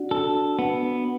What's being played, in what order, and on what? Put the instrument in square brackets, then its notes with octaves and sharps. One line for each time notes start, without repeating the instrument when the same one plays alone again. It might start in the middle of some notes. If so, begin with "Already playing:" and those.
Already playing: [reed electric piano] D4 F#4
[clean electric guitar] A4
B3